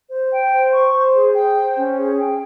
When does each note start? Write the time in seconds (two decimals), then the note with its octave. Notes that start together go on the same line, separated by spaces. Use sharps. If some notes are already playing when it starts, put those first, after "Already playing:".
0.10 C5
0.32 G5
0.53 C5
0.73 C#6
0.94 C5
1.14 G#4
1.35 G5
1.56 C5
1.76 C#4
1.97 G#4
2.17 G5